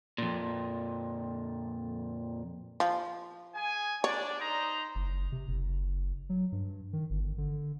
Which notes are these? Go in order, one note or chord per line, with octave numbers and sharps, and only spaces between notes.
F2 A#2
F3
G#4 G#5
D4 C#5 D5
D#4 C5 A#5
F#1
C3
F#1
F#3
G2
D#3
G1
D3